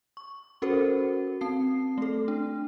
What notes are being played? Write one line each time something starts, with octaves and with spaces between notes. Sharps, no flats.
C#6
C#4 F#4 A4 A#4 C5
C4 A5 C7
A3 A4
D4